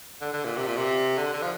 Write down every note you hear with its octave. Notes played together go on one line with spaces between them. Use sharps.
D3
D3
A#2
C3
A#2
C3
D3
D3
F3